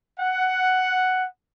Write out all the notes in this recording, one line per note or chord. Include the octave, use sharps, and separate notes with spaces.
F#5